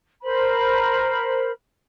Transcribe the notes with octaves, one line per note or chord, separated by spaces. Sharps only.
A#4 C5 B5